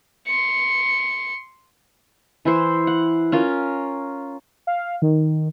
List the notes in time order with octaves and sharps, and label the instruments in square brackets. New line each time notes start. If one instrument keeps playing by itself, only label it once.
[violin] C6 C#7
[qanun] E3 E4 C5
F#5
C#4 F4 A#4
[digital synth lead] F5
D#3